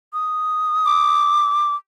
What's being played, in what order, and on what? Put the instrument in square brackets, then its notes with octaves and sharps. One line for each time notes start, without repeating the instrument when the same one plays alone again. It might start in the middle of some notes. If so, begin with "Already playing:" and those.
[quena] D#6
[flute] D6